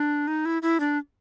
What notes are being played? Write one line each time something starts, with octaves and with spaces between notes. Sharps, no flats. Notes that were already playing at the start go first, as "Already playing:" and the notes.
Already playing: D4
D#4
E4
E4
D4